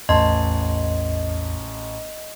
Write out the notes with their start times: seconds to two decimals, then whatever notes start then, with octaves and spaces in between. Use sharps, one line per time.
0.09 A1 E2 D#5 A5 C6